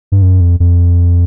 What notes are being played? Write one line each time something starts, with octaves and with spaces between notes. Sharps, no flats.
G2
F#2
F2
F2